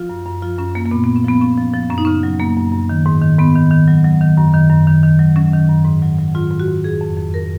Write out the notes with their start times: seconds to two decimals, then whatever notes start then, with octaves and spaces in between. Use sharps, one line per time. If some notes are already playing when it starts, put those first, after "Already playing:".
Already playing: F3 F4
0.09 F#2
0.26 F#2
0.42 F3 F4
0.58 F#2 C#4
0.75 F#2 A#3
0.85 A#3
0.91 A#2 B3
1.04 B3
1.08 F3
1.16 C#4
1.24 F3 B3
1.41 F3 C#4
1.58 F3
1.74 F3
1.90 F#2 C#4
1.98 D#4
2.05 C#3 C#4
2.23 F#3
2.40 F#2 A#3
2.57 F#2
2.73 F#2
2.89 D#3
3.06 G#2
3.22 D#3
3.39 G#2 B3
3.55 D#3
3.71 D#3
3.88 F#3
4.04 F#3
4.21 D#3
4.37 F#2
4.54 D#3
4.70 F#2
4.87 D#3
5.03 D#3
5.19 F#3
5.36 F#3 C#4
5.53 D#3
5.69 F#2
5.85 G#2
6.02 F#3
6.18 F#3
6.35 G#2 F4
6.51 G#2
6.60 F#4
6.68 G#2
6.84 F2 G#4
7.01 F2
7.17 F2
7.34 A#4